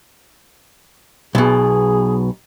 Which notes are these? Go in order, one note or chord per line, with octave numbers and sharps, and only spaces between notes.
B1 B2 G#4